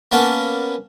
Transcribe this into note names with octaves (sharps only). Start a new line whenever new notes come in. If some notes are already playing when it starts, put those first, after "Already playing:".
A#3 B3 C#4 F#5 A5